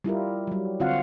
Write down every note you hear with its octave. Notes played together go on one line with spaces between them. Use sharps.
G3 E4 F4 A#4
F#3 G3
D3 C4 F4 F#4 F5 F#5